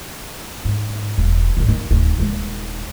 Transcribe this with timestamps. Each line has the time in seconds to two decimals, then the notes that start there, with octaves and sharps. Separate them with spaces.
0.65 G#2
1.18 E1
1.57 A1 D3
1.69 D#3
1.90 D1 D#3
2.18 D#1 G#3